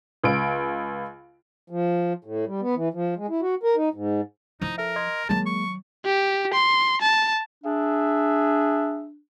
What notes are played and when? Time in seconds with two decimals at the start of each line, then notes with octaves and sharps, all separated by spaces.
0.24 C#2 D7
1.70 F3
2.25 A2
2.47 G3
2.61 B3
2.75 E3
2.94 F3
3.17 G#3
3.30 E4
3.42 F#4
3.63 A#4
3.76 D#4
3.94 G#2
4.61 F3 D#4 E4
4.78 A4 A#4 E5
4.96 D#5 C6 G#6
5.29 D#3 F#3 G#3 A#3 A5
5.46 C#6
6.06 G4
6.54 C6
7.01 A5
7.64 D4 G#4 E5